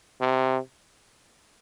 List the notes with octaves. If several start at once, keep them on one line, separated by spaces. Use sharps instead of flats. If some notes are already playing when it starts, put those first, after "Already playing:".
C3